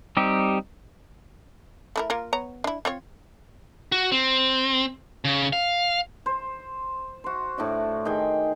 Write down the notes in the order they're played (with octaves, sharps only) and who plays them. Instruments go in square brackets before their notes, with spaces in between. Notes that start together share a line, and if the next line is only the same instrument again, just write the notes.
[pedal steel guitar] G3 C4 D#4 G4
[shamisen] A3 E4 A#4
A#3 F4 A#4
B3 C#5 A#5
D4 E4
C4 F4 C#5
[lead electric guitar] F#4
C4
C#3
F5
[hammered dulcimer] C5
F#4 C5
A2 D4 F#4 D5
D#3 G#4 G5 G#5